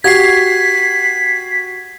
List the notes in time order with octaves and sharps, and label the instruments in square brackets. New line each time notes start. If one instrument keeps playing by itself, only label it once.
[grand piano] F#4 G4 [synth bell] G#6 C7 [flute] B6